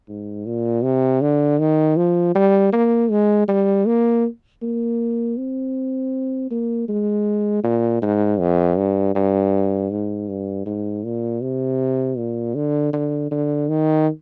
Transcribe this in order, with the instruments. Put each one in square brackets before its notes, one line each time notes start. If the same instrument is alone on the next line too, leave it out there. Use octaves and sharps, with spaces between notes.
[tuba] G#2
A#2
C3
D3
D#3
F3
G3
A#3
G#3
G3
A#3
A#3
C4
A#3
G#3
A#2
G#2
F2
G2
G2
G#2
G2
G#2
A#2
C3
A#2
D3
D3
D3
D#3